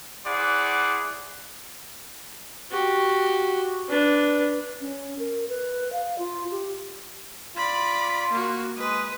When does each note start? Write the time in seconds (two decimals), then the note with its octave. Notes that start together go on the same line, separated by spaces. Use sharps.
0.25 E4 G#4 C5 D5 F#5
2.71 F#4 G4
3.89 D4 B4
4.81 C#4
5.19 A#4
5.49 B4
5.93 F5
6.18 F4
6.51 G4
7.57 F4 D5 B5
8.32 A#3 F#4
8.78 G#3 B4 D#6